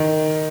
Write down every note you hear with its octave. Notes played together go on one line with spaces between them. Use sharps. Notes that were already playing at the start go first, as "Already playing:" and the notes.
Already playing: D#3